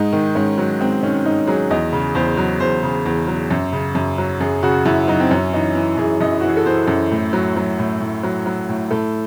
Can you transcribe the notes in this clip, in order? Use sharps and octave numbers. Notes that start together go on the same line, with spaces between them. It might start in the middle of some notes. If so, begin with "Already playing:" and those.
Already playing: G#2 D#4
D#3
G#2 C#4
F#3
G#2 C4
D#3 C#4
G#2 D#4
F#3 G#4
E2 D#5
C#3
E2 C5
F#3
E2 C5
C#3
E2
F#3
F#2
C#3
F#2
F#3
F#2 G#4
C#3 F#4
F#2 E4
F#3 D#4
C4
F#2 C#4
E3 D#4
E3
F#2 G#4
F#2 D#5
E4
E3 F#4
G#4
A4
E3 C5
F#2
A2
F#3
F#3
A2
A2
F#3
F#3
A2
A2 A4